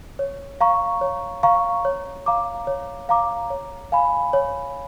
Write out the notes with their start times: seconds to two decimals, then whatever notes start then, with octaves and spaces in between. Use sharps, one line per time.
0.19 C#5
0.61 F5 A#5 C#6
1.01 C#5
1.43 F5 A#5 C#6
1.85 C#5
2.26 F5 A#5 D6
2.67 C#5
3.09 F5 A#5 D6
3.50 C#5
3.92 F5 G#5 B5
4.33 C#5